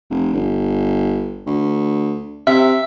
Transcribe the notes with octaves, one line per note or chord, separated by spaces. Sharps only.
F1
G1
D2
C3 E5